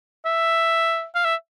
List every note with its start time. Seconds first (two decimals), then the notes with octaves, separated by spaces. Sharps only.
0.25 E5
1.15 F5
1.25 E5